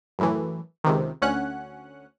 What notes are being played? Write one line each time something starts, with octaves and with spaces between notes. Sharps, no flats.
F#2 A2 E3
C#2 C3 D#3
D2 C#4 F#5 F#6